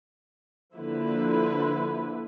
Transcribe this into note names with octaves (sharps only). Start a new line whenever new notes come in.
D3 F3 A#3 E4 B4